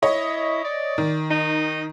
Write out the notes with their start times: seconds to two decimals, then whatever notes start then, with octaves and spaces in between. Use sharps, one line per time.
0.03 E4 C#5 D#5
0.64 D5
0.98 D#3
1.30 D#4